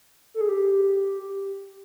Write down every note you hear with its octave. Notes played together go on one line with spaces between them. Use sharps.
A4
G#4
G4